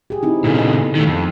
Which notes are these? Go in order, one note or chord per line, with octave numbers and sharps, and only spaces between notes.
G4 G#4
C4 D#4 E4
A#2 C#3 E4 A4
B3 D#5
D#3 A3
F2